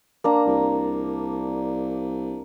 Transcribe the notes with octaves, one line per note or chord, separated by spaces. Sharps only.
A#3 D4 A#5
C2